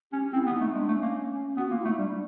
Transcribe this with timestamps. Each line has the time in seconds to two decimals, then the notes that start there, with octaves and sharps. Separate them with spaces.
0.12 C#4 G4
0.33 C4 E4
0.46 B3
0.53 D#4
0.61 A3
0.74 G#3 D4
0.88 A3
0.95 C#4
1.02 A#3
1.57 B3 F#4
1.69 A#3 F4
1.79 E4
1.85 A3
1.89 D#4
1.98 G3 D4